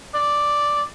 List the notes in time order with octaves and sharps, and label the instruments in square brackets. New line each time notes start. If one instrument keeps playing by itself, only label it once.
[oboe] D5